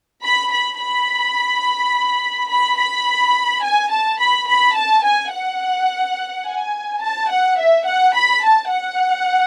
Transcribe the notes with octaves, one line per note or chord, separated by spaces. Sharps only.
B5
B5
B5
B5
B5
G#5
A5
B5
B5
A5
G#5
F#5
G#5
A5
F#5
E5
F#5
B5
A5
F#5